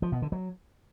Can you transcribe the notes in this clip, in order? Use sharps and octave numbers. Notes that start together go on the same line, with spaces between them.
F3
B2
D3
F#3